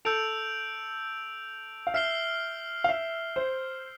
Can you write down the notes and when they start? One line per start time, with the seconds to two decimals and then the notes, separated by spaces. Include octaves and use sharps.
0.05 A4 E6 G6 D7 F7
1.87 F5
1.94 E5 F6 C7 G7
2.84 F5
2.89 E5
3.36 C5